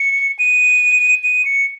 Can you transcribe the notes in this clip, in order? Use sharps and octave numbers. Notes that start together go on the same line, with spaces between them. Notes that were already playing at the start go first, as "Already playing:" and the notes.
Already playing: C#7
D#7
D#7
C#7